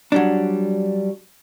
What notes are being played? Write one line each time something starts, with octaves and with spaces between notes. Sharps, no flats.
F#3 G3 D4